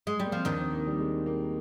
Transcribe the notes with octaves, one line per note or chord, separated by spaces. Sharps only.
G#3
G3
A#3
F3 C4
D#2 D#3 D4
C4
A#3
G3
G#3
A#3